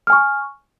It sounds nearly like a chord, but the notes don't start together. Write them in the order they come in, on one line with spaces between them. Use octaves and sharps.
F6 G#5 C#6